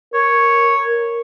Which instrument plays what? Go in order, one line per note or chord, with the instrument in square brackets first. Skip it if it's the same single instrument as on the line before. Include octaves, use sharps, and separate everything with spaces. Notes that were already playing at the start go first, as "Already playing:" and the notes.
[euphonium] A#4 [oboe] C#5